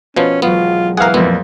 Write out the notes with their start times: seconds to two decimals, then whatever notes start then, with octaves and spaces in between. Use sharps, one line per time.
0.16 B2 F3 B3 C#4
0.42 E1 F#3 G#3 B3 F4
0.97 E3 G#4 A#4 F5 F#5
1.14 F2 A#2 B3